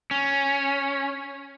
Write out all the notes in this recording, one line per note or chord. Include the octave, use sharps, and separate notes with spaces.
C#4